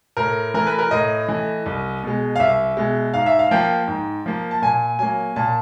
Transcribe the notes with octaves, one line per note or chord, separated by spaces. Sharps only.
A2 A#4
E3 A3 A#4
B4
A#4
A2 D#5
E3 A3
C2
B2 G#3
F5
C2 E5
B2 G#3
G#2 F5
E5
F5
F3 A#3 G5
G#2
F3 A#3
A5
A#2 G#5
F#3 A#3 G#5
A#2 A5